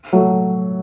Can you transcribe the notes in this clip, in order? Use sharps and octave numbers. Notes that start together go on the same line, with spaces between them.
F#3 A3